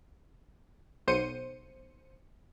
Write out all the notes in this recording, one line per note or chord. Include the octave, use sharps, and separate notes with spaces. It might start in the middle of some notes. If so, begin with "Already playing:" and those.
B1 C5 C#7 D#7